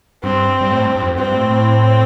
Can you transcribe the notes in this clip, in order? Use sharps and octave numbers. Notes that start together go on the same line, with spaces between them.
G2 C4
G2
A2
G2
G2
F2
G2 C4
A2
A2